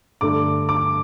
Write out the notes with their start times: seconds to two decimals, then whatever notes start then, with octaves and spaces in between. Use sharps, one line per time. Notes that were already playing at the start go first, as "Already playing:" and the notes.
0.21 G2 D3 A3 D4 D6
0.69 D6